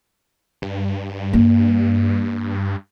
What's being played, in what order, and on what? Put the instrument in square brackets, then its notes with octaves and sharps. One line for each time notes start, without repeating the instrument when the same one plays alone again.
[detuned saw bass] G2
[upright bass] A#3